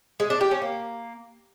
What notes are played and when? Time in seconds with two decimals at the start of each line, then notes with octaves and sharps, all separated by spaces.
0.20 G#3
0.30 D4
0.41 G4
0.51 C#4
0.62 A#3